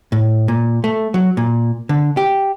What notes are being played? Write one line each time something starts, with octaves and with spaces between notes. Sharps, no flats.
A2
A#2
A3
F#3
A#2
D3
G4